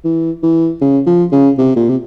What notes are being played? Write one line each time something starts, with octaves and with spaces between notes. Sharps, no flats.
E3
E3
C#3
F3
C#3
C3
A#2
C3